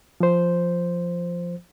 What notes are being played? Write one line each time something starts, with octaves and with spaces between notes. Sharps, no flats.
F3 C5